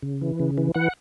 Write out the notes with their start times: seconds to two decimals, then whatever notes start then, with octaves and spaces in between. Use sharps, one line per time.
0.02 C#3
0.21 E3
0.40 C#3
0.58 E3
0.75 E3 F#5